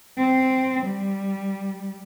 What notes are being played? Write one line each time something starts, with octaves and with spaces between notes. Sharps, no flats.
C4
G3